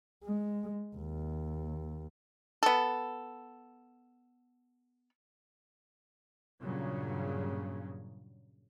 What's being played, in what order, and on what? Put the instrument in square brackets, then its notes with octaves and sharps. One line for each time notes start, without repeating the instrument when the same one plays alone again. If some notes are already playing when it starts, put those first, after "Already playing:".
[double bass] G#3
D#2
[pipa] B3 A4
[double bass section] G2 A#2 C#3 F#3